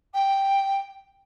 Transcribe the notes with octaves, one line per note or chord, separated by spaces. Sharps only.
G5